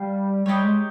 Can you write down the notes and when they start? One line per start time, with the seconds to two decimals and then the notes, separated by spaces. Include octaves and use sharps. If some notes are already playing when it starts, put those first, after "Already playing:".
Already playing: G3 G4 F5
0.46 G3 D#4 G4 C#5
0.64 G#3